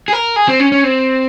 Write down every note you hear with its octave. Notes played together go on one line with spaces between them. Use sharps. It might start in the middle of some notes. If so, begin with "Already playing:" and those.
G#4
A#4
G#4
C4
C#4
C#4
C4